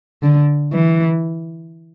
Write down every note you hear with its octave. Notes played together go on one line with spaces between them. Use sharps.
D3
E3